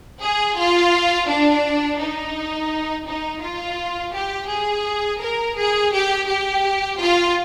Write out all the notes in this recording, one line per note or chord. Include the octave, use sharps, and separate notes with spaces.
G#4
F4
D4
D#4
D#4
F4
G4
G#4
A#4
G#4
G4
G4
F4